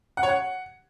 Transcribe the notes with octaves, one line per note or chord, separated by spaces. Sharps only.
F#5
C#5
F#5